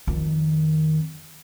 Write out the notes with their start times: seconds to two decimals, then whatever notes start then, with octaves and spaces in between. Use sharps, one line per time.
0.07 F2 D#3